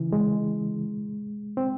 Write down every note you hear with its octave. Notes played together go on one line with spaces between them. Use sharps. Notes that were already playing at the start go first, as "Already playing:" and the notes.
Already playing: C#3 E3
G#3
C4